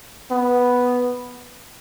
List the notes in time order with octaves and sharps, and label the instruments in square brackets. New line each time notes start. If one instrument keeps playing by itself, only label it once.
[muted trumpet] B3